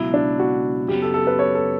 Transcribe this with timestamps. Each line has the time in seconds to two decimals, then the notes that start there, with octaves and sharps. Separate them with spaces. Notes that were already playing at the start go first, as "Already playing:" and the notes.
Already playing: C#2 B2 F#3 E4
0.14 D4
0.39 F#4
0.88 F#2 C#3 F#3 B3 G4
1.02 A4
1.14 A4
1.27 B4
1.39 C#5
1.55 A4